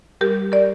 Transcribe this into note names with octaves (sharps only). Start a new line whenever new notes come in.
G3 G4 A#4
A#4 D5